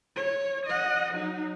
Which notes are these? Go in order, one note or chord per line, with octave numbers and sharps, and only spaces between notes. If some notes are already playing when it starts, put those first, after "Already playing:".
C#5
D#5 F#5
F#3 D#4